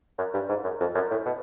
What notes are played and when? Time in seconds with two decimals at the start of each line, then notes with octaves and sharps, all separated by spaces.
0.18 F#2
0.34 G2
0.49 G#2
0.64 F#2
0.80 F2
0.95 F#2
1.11 A2
1.26 B2